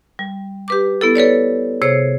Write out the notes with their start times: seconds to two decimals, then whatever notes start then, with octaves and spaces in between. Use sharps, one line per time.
0.19 G3
0.68 G4 B4 D6
1.01 B3 E4 A4
1.15 A4 B4 C#5 D5
1.82 C3 G#4 C5 C#5